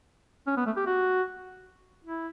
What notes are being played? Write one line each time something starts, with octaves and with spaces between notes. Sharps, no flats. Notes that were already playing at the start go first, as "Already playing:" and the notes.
C#4
B3
A3
G4
F#4
E4